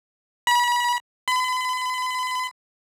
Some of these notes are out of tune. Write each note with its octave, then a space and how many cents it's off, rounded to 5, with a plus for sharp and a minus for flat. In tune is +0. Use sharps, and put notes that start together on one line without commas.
B5 -35
B5 +40